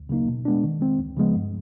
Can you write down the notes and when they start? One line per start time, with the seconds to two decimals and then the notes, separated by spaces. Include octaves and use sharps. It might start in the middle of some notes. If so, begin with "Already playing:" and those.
Already playing: D2
0.09 C#3 F#3 A#3 D#4
0.28 B2
0.45 G#3 B3 D4
0.64 D#3
0.81 G#3 C4
0.99 D2
1.17 C#3 F3 G#3 B3
1.35 G2